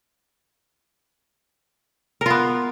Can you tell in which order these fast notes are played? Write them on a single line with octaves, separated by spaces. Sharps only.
A#4 F4 B3